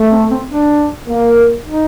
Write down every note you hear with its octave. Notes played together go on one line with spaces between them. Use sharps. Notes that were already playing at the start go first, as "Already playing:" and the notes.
Already playing: A3
C4
C4
D4
A#3
D#4